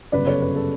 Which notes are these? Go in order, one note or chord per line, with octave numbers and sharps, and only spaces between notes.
G1 F#2 C#3 B4 D5
A4 C#5
B4
A4